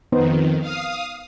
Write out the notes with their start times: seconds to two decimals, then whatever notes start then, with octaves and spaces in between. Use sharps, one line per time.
0.12 F2 D#3 B3 D#4 C5
0.60 F5 D#6